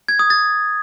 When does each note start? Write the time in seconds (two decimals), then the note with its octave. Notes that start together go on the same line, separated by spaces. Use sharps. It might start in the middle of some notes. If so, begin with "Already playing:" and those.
0.08 G#6
0.19 D#6
0.30 A6